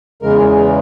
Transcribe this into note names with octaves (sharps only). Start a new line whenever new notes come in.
E2 C#3 E3 G#3 A#4